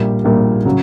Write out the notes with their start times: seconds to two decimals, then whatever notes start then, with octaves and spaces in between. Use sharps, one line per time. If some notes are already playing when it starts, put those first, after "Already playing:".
Already playing: A#1 A#2 G3
0.24 A#1 A#2 G3
0.65 C#3 F#3